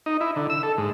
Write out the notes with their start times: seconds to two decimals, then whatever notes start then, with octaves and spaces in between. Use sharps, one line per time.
0.06 D#4
0.21 E4
0.36 D3
0.50 E6
0.63 A4
0.78 G#2